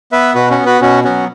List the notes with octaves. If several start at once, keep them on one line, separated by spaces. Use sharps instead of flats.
B3 B4 E5
B2 F#4 B4
C#4 F#4
B3
F#4 B4
B2 C#4 F#4
F#3 B3 C#4 F#4